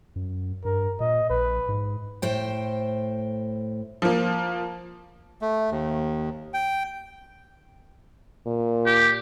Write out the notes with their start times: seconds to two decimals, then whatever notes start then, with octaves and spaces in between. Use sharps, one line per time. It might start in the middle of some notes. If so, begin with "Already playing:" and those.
0.16 F#2
0.65 G2 A#4
1.00 A#2 D#5
1.30 A#1 B4
1.69 G#2
2.22 A2 C5 G5
4.02 F3 A#3
5.42 A3
5.71 D#2
6.54 G5
8.46 A#2
8.86 G4